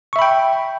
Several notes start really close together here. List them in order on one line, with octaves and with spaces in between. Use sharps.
C#6 E5 B5 G5